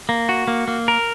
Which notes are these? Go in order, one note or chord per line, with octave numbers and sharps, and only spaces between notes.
A#3
F#4
A#3
A#3
A#4